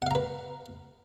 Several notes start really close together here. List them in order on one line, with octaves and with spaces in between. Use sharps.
F#5 F5 A#5 B4